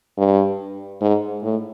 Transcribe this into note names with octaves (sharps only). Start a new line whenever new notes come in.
G2
G#2
A2